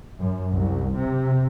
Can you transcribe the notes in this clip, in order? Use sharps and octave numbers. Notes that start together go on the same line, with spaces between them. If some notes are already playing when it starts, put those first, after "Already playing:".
F#2
C2
C3